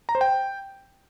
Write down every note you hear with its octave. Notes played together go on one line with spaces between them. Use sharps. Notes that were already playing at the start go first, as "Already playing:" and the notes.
A#5
C5
G5